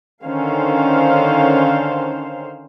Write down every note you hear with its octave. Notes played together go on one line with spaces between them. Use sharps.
D3 D#3 C#4 C5 F5